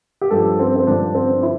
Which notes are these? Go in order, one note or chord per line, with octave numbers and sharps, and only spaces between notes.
G4
G2 F3 A4
C4
C4
G2 D3 F3 D4
C4
E4